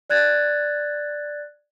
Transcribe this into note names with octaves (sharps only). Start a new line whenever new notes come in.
D5 F#6 G#6 A6